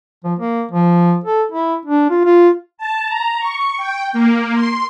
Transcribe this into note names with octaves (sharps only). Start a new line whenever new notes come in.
F3
A#3
F3
A4
E4
D4
F4
F4
A5
A#5
C#6
G5
A#3
C6